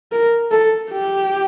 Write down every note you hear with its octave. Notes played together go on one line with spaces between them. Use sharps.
A#4
A4
G4